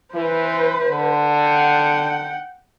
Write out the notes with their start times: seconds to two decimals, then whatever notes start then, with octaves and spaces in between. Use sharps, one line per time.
0.15 E3 B4 C5
0.90 D3
1.39 F#5 G5